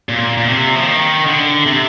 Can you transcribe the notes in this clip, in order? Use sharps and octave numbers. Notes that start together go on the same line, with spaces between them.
A#2
A#2
C3
F3
D#3
D3
C3